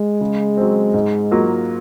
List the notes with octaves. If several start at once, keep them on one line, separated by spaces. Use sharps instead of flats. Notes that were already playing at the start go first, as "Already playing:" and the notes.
Already playing: G#3
C#3
F#3 C4
G#2
F#3 A#3 F4 A#4